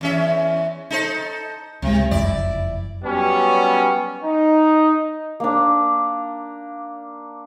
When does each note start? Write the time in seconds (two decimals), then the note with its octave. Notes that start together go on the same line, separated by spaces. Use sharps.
0.01 E2 C#4 E5
0.90 D#4 A4 C5
1.82 C#2 C3 F3 G#3
2.11 F#1 F2 E4 D5
3.04 F#3 G3 B3 C#4
4.23 D#4
5.40 A#3 D4